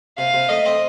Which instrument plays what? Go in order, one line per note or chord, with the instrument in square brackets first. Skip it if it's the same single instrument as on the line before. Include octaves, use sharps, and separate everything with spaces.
[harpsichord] C3 [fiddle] F5
[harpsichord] C3
[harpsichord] A3 [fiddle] D#5
[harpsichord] C4